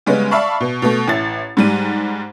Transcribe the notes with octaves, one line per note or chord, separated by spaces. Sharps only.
C#3 G3 G#3 B3 C#4
D5 E5 F5 A5 B5 C#6
B2
B2 A3
A1 E4 A6
G#2 G3 D#7